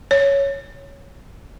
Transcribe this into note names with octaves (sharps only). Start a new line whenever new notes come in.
C#5